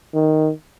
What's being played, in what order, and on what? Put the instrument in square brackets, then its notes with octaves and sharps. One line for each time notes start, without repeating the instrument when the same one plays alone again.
[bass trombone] D#3